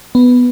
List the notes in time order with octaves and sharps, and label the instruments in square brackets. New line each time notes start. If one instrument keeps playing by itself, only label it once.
[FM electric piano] B3